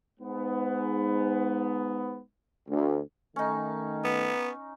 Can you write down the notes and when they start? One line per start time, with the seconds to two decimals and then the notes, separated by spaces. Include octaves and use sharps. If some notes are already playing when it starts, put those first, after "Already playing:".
0.20 G#2 B3
2.68 D2
3.36 D#3 A3 C#4 D#4
4.04 B3